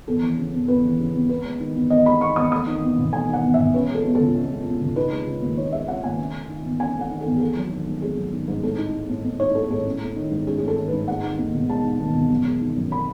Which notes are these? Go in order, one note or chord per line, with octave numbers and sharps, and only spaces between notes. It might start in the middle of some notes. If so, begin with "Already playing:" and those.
E2 A4
E3
C#3
E2
E2 B4
E3
C#3
E2
B3 B4
G#3
D#3
E2
B3 D#5
G#3 B5
D#3 C#6
E2 D#6
A3 D#6
D#3
E2
E1
A3 G#5
D#3 F#5
E2
E5
E1
C#4 B4
G#3
A4
B2
A4
C#2
C#4
G#3
B2
C#2
D#4 B4
G#3
C#3
D#2
D#4 C#5
G#3 E5
C#3 F#5
D#2 G#5
C#4
A3
D#3
E2
C#4 G#5
A3
F#5
D#3
A4
E2
G#4
A3 A4
F#3
D#3
G#2
A3 G#4
F#3
D#3
G#2
A2 A4
D#4
G#3
A2
A2
D#4 C#5
G#3 A4
A2 A4
C#4
A3
D#3
G#2
C#4 G#4
A3 G#4
A4
D#3
B4
G#2
G#3 F#5
D#3
D#2
E1
G#3 A5
D#3
D#2
E1
F#2
G#3
D#3
F#2
B5